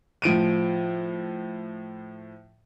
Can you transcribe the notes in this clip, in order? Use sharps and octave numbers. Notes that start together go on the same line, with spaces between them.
A2 F3 D7 D#7